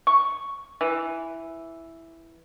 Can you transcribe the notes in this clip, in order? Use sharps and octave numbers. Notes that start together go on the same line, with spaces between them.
C#6
E3